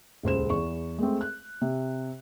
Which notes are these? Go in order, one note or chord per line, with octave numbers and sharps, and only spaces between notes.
D#1 C#2 C5 E7
E2 C#6
G#3 A3 C4
F#6
C3